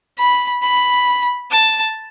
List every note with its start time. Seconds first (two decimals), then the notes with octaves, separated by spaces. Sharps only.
0.18 B5
0.62 B5
1.51 A5